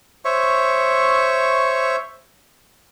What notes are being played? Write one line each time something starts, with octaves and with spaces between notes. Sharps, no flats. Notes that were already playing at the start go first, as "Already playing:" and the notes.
C5 C#5 E5 C#6